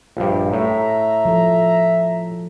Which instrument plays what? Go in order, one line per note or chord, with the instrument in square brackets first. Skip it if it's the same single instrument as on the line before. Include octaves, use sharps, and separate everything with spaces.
[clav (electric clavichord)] A#1 G2
[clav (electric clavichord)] A2 [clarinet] E5 [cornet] A#5
[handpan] F3 A4